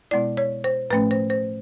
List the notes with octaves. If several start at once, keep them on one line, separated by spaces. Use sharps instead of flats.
B2 G#3 B3 E4 D5
C#5
C5
A2 F3 A3 C#4 B4
C5
C5